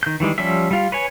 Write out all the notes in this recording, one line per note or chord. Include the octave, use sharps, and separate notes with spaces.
D#3 G6
D#3 E3 G3 G#3
F3 G3 C#4 G4 E5
G3 F4
B4 C#5 G#5